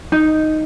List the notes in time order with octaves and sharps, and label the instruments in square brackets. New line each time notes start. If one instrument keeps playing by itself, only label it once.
[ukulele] D#4